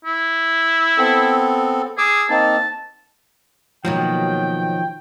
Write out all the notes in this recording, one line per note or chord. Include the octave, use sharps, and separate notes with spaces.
E4
B3 C4 A4
G#4 D6 E6
A#3 C4 D#4 A5
B2 D#3 F3 F#3 A#3 G5